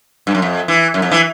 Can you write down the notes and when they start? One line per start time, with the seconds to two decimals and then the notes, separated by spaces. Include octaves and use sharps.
0.27 G2
0.35 F#2
0.42 F2
0.68 E3
0.94 F#2
1.02 F2
1.12 E3